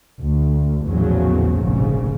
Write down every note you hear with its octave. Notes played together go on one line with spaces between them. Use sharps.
D2
A#1 E2 A2 C#3 F3 F#3
F1 A#1 G#2 C#3